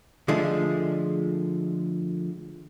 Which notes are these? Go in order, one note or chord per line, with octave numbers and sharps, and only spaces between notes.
D3 F3 G#3 A3